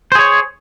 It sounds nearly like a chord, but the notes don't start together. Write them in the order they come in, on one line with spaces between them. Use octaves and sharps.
C5 G#4 C#5